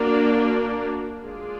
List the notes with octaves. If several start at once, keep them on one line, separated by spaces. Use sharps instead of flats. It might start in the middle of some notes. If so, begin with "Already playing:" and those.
Already playing: A#3 D4 F#4 A#4 D5
G#3 D4 F4 G#4 D5